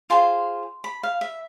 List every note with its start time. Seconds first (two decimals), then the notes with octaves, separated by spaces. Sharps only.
0.10 F4 G#4 C5 C6
0.84 B5
1.03 F5
1.21 E5